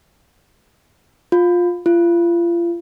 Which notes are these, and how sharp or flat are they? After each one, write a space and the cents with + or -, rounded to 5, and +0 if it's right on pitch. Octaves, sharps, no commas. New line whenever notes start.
F4 +15
F4 -35